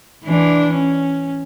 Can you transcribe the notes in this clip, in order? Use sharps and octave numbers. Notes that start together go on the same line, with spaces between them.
E3 D4
C#4